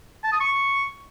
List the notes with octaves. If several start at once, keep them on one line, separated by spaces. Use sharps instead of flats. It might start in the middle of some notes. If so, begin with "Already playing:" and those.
A5
D#6
C#6